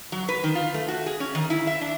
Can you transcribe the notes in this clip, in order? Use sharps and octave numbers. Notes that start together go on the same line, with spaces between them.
F#3
B4
D#3
F4
A3
F#4
G#4
C#4
D#3
E4
E5
D4